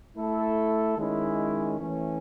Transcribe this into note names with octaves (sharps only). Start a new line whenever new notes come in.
A3 E4 A4
D#3 G#3 C#4 E4
E3 A3 C#4